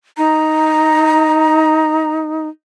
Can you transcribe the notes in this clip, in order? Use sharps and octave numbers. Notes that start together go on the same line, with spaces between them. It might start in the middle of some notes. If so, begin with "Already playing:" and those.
D#4 A#5